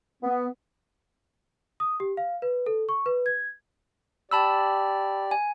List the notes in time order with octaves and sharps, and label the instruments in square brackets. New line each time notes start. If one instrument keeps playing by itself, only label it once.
[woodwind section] B3
[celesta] D#6
G4
F5
B4
A4
C#6
B4
G#6
[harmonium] G4 D5 [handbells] A5 B5 E6
[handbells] G#5